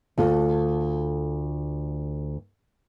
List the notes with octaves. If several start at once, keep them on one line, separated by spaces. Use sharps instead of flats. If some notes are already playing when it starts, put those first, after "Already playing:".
D2 F4 A4